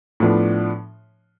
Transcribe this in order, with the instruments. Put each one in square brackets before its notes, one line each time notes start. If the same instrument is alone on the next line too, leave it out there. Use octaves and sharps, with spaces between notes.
[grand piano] A2 F3 B3 D4